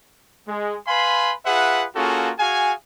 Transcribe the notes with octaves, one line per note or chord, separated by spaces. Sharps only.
G#3
B4 F5 G#5 B5 C6
F4 G#4 B4 E5 F#5
A#3 C#4 F4 F#4 G#4 A4
F#4 G#4 F5 G#5